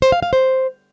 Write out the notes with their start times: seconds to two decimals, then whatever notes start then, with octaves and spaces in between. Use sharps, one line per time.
0.02 C5
0.12 F5
0.23 F5
0.33 C5